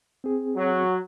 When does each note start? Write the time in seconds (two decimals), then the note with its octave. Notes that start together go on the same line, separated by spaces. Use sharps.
0.24 C4 G#4
0.56 F#3